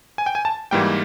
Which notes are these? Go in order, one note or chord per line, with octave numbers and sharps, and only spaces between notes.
G#5
G5
G#5
A5
G#2 E3 G3 A#3 G5